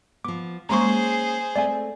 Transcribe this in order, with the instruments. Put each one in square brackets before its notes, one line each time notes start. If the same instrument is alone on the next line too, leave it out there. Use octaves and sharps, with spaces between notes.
[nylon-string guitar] F3 B3 [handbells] D6
[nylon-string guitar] G#3 A#3 C#4 [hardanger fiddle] G#4 C5 [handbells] A#5 C6 C#6
[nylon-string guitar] A3 C4 [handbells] D5 E5 G#5